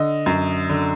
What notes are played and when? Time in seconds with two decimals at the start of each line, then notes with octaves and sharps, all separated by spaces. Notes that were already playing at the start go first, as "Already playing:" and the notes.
Already playing: D3 D#5
0.26 F#2
0.69 D3